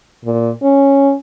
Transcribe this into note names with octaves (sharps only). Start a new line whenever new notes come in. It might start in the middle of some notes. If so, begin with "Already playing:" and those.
A#2
C#4